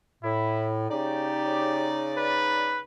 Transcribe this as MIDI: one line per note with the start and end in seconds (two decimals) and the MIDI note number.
0.23 0.88 45
0.23 0.67 64
0.90 2.82 49
0.90 2.82 63
0.90 1.89 67
0.90 2.82 74
2.18 2.81 71